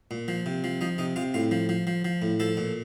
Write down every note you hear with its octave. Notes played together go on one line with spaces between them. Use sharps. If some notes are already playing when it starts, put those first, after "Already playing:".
A#2
F3
C3
F3
F3 D#4
C3 D#4
C3 F4
A2 F4
F3
F3
F3
F3
A2
F3 A4
A#2